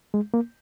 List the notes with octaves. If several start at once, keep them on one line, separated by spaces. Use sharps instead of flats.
G#3
A#3